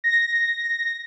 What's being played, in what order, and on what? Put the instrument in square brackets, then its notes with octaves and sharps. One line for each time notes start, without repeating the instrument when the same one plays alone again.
[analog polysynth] A#6